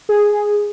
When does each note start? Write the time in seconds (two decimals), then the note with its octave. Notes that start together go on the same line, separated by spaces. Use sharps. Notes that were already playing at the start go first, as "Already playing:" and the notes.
0.09 G#4